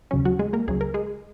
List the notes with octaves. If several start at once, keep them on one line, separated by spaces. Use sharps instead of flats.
D#2 C#3 F#3 C#4
F#3 F#4
G#3 G#4
A#3 A#4
C#2 C#3 F#3 G#4
A#4
G#3 G#4